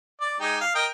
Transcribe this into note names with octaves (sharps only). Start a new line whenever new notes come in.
D5
G#3 D#4 G4
F5
A#4 D#5 G5